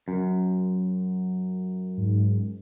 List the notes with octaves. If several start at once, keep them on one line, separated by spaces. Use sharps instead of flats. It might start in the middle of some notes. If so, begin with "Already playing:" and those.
F#2
G#2